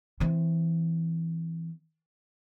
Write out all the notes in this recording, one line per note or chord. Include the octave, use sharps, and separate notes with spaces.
E3 C4